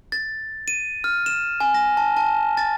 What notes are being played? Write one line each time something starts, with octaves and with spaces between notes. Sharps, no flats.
A6
D#7
F6
E7
G#5
A#6
A5
A5
A6